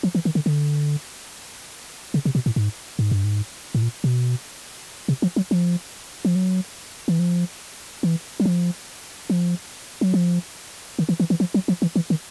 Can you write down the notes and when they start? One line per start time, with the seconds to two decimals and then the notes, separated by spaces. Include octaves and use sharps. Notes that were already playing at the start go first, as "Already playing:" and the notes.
0.03 F3
0.15 E3
0.25 D#3
0.35 D3
0.46 D3
2.14 C#3
2.25 C3
2.35 B2
2.46 A2
2.56 G#2
2.99 G#2
3.11 G2
3.24 G#2
3.75 A2
3.82 A#2
4.04 B2
5.08 C3
5.22 F3
5.36 F#3
5.51 F3
6.25 F3
6.35 F#3
7.08 E3
7.19 F3
8.03 E3
8.40 F#3
8.45 F3
9.30 F3
10.01 F#3
10.14 F3
10.99 D#3
11.09 E3
11.20 E3
11.30 E3
11.40 F3
11.54 F#3
11.68 F3
11.82 E3
11.96 E3
12.10 D#3